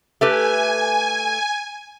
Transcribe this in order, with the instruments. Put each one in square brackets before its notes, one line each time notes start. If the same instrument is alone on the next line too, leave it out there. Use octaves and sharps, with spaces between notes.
[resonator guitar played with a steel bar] A3 G4 B4 [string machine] G#5